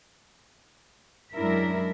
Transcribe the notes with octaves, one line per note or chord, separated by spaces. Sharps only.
F#2 G#3 D4 E4 A#4 E5